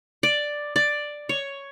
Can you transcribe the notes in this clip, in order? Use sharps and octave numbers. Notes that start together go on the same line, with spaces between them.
D5
D5
C#5